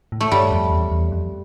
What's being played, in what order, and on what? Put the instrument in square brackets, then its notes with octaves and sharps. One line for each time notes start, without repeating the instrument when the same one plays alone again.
[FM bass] A2
[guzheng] A3
[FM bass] G2 [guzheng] G3
[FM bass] F2
E2
E2
F2